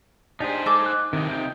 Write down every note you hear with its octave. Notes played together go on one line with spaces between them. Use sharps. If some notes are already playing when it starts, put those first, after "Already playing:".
D4 D#4 G4 G#4 C5
G#3 A4 G#5 D6
F#6
C3 D#3 D#4
G5